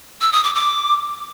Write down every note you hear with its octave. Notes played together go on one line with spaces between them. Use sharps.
E6
D#6
D6
D6